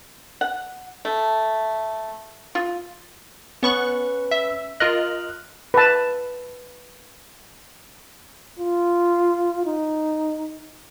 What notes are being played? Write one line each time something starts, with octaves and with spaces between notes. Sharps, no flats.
F#5
A3
F4
B3 C#4 B4 C#6 F#6
E5
F4 A#4 D#5 F6 F#6
B4 A5
F4
D#4